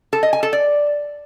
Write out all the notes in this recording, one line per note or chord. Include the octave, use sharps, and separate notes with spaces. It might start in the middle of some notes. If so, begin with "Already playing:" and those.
A4
D#5
G#5
A4
D5